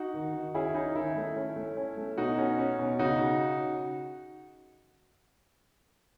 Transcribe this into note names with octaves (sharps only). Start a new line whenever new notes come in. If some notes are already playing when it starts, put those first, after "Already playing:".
Already playing: D#4 F#4
D#3
D#3
C#4 E4 G#4
C#4 D#4
D#3 E4
A3
C#4
A3
C#4
A3
B2 D#4 F#4
C#4
C#4
B2
C#3 D#4 F#4
C#3